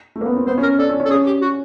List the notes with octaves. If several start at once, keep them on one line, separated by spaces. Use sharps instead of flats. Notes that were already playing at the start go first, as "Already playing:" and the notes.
A3
A#3
B3
C4
B3 C5
C#4
A#4
D4 A4
C#4
C#4
A4
C#4 G#4
G4
F#4